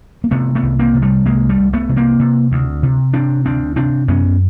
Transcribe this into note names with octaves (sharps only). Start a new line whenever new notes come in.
A#3
C3 A3 B3
A3 B3
C2
A#3 C4
C3
G3 A3
C2 G#3 A#3
G3 A3
C2
A3 B3
C3
A#3 C4
C3
D2
C3
C3 C4 D4
D2 C4 D4
C3 C4 D4
F#2 B3 C#4